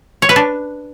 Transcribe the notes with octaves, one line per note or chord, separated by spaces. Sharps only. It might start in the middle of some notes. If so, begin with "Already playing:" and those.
C#5
B4
D4